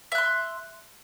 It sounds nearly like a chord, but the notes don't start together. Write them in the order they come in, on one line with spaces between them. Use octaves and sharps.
E5 F#6 C6